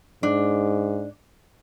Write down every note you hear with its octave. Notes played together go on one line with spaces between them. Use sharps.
G#2 D4